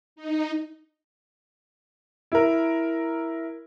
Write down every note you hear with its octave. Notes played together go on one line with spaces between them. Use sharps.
D#4
E4 A#4